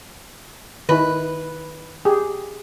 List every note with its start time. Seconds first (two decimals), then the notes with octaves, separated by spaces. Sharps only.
0.89 D#3 E4 B4
2.05 G4 G#4